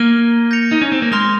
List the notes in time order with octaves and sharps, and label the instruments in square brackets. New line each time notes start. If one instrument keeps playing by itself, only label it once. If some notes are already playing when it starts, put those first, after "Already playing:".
Already playing: [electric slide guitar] A#3 [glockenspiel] F6 G#6 D#7 G7
[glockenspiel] G6 A#6 C#7 F7
[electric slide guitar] D#4
C#4
C4
A#3
[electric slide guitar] G#3 [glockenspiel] C6 F6 A#6 F7